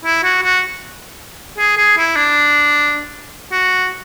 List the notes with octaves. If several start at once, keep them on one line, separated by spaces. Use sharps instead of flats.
E4
F#4
F#4
G#4
G#4
E4
D4
F#4